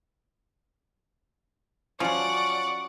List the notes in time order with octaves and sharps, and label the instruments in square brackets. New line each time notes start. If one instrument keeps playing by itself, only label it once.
[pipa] F3 [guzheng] F#3 C#4 [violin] D5 F#5 [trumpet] C#6